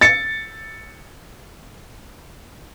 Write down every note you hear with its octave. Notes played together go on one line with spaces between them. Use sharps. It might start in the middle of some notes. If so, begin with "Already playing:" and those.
A6 C#7